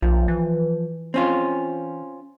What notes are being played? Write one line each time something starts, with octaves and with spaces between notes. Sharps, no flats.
B1 F3
E3
C4 C#4 F4